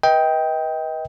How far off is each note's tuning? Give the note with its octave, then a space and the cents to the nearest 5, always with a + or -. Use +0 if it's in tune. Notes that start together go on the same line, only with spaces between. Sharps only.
B4 -30 D#5 +30 G5 +0